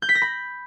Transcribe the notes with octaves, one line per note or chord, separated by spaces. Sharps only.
G6
B6
A#6
B5